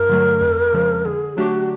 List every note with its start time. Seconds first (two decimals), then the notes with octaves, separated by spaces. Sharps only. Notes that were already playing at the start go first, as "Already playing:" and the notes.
Already playing: G2 A#4
0.09 D3 F#3 A3
0.41 F2
0.73 C#3 F3 G#3
1.05 D3 G#4
1.37 F#3 A3 D4 F#4 G4